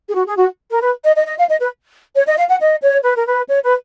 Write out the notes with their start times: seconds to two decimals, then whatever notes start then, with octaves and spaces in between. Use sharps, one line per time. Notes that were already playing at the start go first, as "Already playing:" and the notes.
0.08 G#4
0.14 F#4
0.26 G#4
0.37 F#4
0.70 A#4
0.81 B4
1.04 D#5
1.15 D#5
1.26 D#5
1.37 F5
1.48 D#5
1.60 B4
2.14 C#5
2.26 D#5
2.38 F5
2.49 F#5
2.60 D#5
2.82 C#5
3.03 B4
3.15 A#4
3.26 B4
3.48 C#5
3.64 B4